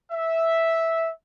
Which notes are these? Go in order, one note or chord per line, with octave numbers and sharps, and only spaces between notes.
E5